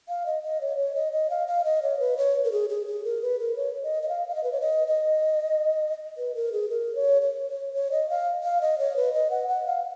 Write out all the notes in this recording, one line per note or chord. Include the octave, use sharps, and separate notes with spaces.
F5
D#5
D#5
C#5
C#5
D#5
D#5
F5
F5
D#5
C#5
B4
C#5
A#4
G#4
G#4
G#4
A#4
B4
A#4
C#5
D#5
D#5
F5
F5
D#5
B4
C#5
D#5
D#5
B4
A#4
G#4
A#4
C#5
C#5
C#5
C#5
D#5
F5
F5
D#5
C#5
B4
D#5
F#5
F#5
F5